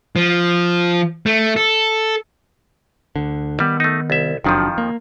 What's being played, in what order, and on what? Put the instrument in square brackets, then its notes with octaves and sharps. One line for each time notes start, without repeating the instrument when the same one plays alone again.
[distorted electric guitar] F3
A3
A4
[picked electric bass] D2 D3
[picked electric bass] D#3 B3 [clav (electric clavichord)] G3
[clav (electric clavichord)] A3 D#4
C2 E5
[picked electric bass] F#1 F#3 D4 [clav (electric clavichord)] F2 D#3 F3
[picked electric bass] A#3